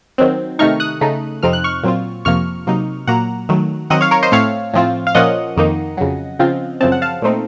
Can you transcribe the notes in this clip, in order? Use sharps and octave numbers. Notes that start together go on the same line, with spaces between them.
D#3 F#3 C4
C3 D#3 A3 D#4 C#6 F6
D#6 F#6
C#3 A3 D#4
F2 C3 F3 C4 D#4 F6
F#6
C#6 F6
A#2 F#3 C4 F4
F2 C3 F3 A#3 C#6 F6
C3 F#3 A#3 D#4
A#2 F#3 A#3 F#5 A#5
D#3 F#3 A3
D#3 F#3 C4 D#5 F#5
C#5 F5
A#4 C#5
C5 D#5
A2 A3 C4 C#5 F5
A2 F3 C4 F4
F5
A#2 F3 A#3 C#4 F4 D#5 F#5
F2 D#3 A#3 D#4
F2 C#3 F#3
C#3 F3 C4 F4
F#2 C#3 F3 C4 A5
F#5
F5 A5
A#2 A3 C4 D#4